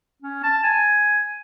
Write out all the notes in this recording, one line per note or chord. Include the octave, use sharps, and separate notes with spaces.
C#4
A5
G#5